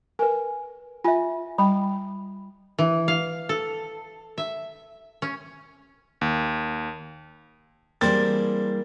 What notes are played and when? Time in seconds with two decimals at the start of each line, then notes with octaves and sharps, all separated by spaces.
0.19 A#4 B4 G#5
1.04 F4 E5 G#5
1.58 G3 G5 B5
2.79 E3
3.08 F5
3.49 A4
4.38 E5
5.22 C#4
6.21 D#2
8.01 E3 G3 A#3 C4 D4 G#4 A#4 A6